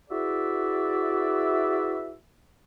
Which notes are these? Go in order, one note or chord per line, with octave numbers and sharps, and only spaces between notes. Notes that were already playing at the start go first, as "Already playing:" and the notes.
E4 F#4 G#4 B4 D5 E5